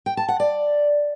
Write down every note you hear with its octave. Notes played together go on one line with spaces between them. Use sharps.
G5
A5
F#5
D5